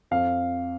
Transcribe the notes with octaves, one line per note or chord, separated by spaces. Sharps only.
F2 F5